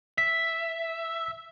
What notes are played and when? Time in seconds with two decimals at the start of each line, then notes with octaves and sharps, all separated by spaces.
0.18 E5 B6